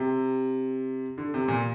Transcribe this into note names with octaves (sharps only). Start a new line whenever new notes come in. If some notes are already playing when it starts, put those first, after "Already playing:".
Already playing: C3
D3
C3
A#2